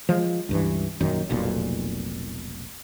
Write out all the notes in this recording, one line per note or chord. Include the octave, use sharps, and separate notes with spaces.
F3 G#3
C#2 G2 E3
A#1 F#2 D#3
F1 B1 A#2